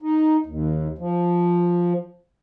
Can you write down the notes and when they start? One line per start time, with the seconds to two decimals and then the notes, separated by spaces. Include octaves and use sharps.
0.02 D#4
0.46 D#2
0.98 F3